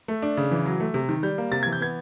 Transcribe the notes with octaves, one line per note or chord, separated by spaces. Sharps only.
A3
D4
C#3
E3
F#3
A3
C3
D#3
G3 G6
A#3
C3 A6
E3 G#6
G6
B3 G#6